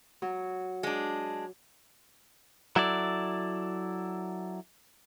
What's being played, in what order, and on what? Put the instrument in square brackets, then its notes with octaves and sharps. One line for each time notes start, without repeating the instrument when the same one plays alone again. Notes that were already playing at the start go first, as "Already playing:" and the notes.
[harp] F#3
[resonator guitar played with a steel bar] G#3 D4
[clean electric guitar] F#3 E4 A4 D5